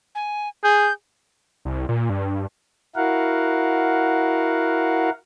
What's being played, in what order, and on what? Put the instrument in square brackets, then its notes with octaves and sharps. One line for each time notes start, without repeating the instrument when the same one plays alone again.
[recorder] G#5
[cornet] G#4 [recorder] G6
[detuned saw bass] C2
A#2
G2
[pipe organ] E4 F#4 A#4 F5 F#5